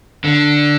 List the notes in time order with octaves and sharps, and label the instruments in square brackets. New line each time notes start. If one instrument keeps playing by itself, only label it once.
[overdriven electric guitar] D3